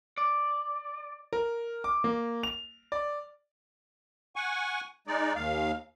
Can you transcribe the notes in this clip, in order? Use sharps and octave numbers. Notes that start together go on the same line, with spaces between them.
D5
A#4
D6
A#3
F7
D5
F#5 G#5 C#6
G#3 D#4 D5
D#2 F5